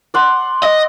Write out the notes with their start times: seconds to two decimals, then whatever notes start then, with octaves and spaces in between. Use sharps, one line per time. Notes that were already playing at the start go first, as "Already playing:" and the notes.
0.14 D5 F#5 C6
0.63 D#5